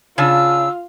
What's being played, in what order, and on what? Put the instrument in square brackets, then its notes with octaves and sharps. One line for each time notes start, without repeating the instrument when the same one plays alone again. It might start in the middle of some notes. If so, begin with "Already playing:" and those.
[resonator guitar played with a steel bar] C#3 D4 A5 [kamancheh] F4 [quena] E6